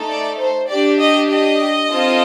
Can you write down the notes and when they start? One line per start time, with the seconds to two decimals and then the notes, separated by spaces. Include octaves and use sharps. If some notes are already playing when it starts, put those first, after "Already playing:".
Already playing: A3 D#4 A4
0.09 D5
0.39 C5
0.69 D4 G4 D5
0.99 D#5
1.30 D#5
1.90 C4 F4 A4